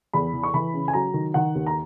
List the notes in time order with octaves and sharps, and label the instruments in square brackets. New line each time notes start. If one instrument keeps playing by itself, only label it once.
[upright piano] E2 B5
E3
C#6
E3 B5
C#3
G#5
F#3 A#5
D#3
D#3 F#5
D#2
A#5